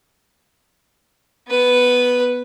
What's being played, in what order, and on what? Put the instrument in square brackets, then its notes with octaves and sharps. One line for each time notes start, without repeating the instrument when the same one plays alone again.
[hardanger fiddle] B3 B4